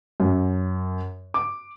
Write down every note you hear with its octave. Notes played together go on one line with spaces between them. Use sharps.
F#2
D6